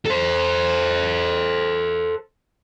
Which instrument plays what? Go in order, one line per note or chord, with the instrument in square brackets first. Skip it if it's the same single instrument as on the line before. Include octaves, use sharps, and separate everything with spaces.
[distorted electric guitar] A4 C5